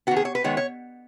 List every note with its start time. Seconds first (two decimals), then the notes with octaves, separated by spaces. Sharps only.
0.07 B3 F#4
0.11 D#3
0.16 G#4
0.25 C#5
0.35 B4
0.44 D#3 G#3 B3 C#5
0.57 C#5